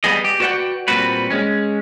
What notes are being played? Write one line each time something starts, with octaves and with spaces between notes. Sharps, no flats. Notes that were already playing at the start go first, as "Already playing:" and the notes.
G3 B3 G#4 D#5
G4
F#4 B4 D5 E5 F#5 G5
A#2 G3 C4 F#4 B4
G#3 C#4